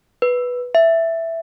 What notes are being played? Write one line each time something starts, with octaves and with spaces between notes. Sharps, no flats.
B4
E5